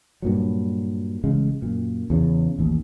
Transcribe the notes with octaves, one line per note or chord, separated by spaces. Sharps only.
G2 A#2 F#3
A1 C#3 G#3
F#2 A#2
E2 C#3
A1 D#2